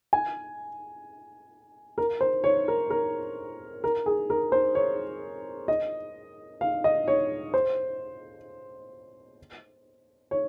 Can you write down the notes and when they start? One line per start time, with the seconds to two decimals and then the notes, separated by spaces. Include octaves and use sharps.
0.13 G#5
1.98 A#4
2.21 C5
2.44 C#5
2.68 A#4
2.90 A#4
3.84 A#4
4.06 G#4
4.30 A#4
4.52 C5
4.75 C#5
5.68 D#5
6.61 F5
6.84 D#5
7.08 C#5
7.54 C5
10.31 C#5